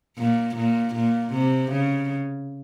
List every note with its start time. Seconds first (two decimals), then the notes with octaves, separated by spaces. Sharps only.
0.18 A#2
0.55 A#2
0.94 A#2
1.33 C3
1.71 C#3